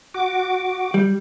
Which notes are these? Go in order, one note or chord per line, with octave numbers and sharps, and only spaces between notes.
F#4 D6
G3